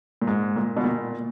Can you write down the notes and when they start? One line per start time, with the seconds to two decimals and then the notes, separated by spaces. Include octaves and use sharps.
0.22 A#2
0.27 G#2
0.56 A#2
0.76 B2
0.84 A#2